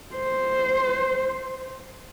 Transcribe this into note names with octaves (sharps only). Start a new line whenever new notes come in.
C5